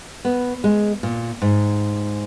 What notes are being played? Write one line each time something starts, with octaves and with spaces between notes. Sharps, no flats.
B3
G#3
A#2
G#2